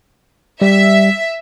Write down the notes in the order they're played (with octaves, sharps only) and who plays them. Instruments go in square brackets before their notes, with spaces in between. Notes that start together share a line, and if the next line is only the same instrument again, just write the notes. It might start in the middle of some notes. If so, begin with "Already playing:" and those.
[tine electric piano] G3 [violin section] E5